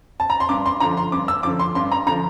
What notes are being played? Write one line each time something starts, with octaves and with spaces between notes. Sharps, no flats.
A5
A#5
C6
G2 D6
C6
D3 F3 A#5
C6
G2 D6
E6
D3 F3 D6
C6
G2 C6
A#5
D3 F3 A#5